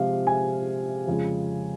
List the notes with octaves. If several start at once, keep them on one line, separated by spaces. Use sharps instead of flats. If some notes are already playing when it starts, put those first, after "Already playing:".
Already playing: C3 F3 G#3 F5
G#5
F2 C#3 G#3